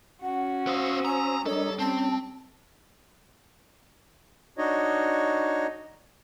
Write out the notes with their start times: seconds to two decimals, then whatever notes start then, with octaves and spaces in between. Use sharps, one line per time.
0.22 C#4 F#4 F#5
0.67 B3 C5 F5 D#6 E6
1.05 G#5 A#5
1.46 G3 D4 A4 A#4 C#5 D#5
1.79 C4 C#4 A5
4.58 D4 D#4 F#4 C#5 D#5